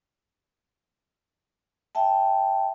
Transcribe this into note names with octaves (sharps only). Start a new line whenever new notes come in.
E5 G5 A5